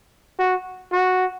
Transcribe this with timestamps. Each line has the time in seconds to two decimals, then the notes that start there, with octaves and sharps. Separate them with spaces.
0.39 F#4
0.93 F#4